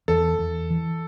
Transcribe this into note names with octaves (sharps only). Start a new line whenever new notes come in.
E2 A4
E2
E3